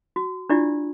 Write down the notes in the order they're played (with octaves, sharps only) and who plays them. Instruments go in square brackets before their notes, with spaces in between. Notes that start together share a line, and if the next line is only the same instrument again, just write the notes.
[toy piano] F#4
D4 E4 F4 G4 D5